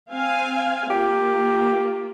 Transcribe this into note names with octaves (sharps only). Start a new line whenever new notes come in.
C4 F5 G#5
A#3 F4 G4